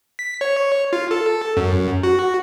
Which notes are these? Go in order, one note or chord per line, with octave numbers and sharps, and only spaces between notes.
B6
C#5
F4
A4
F#2
F#4